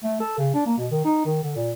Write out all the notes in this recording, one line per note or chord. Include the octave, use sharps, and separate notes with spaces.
A3
A4
C#3
D4
A#3
B2
D#3
D#4
D#3
D3
A#2